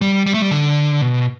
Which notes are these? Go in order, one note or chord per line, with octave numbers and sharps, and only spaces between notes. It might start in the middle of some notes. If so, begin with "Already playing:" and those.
G3
G3
A3
G3
D3
B2